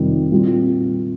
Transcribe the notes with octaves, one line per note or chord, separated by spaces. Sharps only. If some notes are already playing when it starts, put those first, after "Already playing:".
Already playing: F2 C3 D#3 G3 C4
A#2 G3 C4 F4